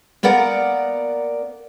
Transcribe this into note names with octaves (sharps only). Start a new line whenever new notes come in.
A#3 B3 A#4 D5 F#5